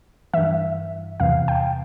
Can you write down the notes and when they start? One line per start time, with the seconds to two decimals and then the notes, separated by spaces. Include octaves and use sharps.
0.34 G2 E3 E5
1.20 E2 C3 E3 F5
1.48 G5